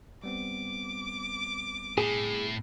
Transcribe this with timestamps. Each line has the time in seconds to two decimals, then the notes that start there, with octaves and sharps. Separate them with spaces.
0.24 G3 B3 C4 D6
1.98 A2 G#4